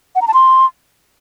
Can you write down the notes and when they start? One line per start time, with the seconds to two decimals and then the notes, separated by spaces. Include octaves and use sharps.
0.15 F#5
0.21 A#5
0.27 A5
0.34 C6